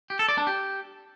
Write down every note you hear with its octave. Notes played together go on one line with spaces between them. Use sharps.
G4
A4
D5
D4
G4